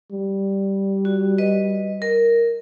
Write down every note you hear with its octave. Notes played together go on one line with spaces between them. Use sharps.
G3
F#4
B4 D#5
A#4